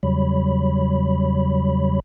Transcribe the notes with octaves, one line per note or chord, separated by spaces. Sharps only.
E2 C#3 F#3 G3 C#5 B5